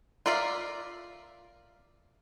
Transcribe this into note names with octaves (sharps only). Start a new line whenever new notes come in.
F4 A#4 D5 E5 F5